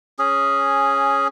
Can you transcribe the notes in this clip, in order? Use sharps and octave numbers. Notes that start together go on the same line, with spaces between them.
C#4 G#4